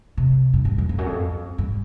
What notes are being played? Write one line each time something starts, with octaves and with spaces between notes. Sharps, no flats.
C3
G2
F#2
F#2
F2
F#2
F2
G2